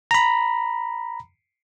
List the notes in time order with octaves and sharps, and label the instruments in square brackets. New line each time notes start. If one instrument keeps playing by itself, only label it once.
[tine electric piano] A#5 B5